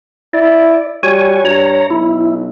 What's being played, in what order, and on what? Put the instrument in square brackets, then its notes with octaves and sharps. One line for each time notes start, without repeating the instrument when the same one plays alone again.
[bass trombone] E4 [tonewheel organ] D5
[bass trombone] G3 [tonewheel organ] F#4 C#5 G#5
[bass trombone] G2 [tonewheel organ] C#5 A#5
[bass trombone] B1 [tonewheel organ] E4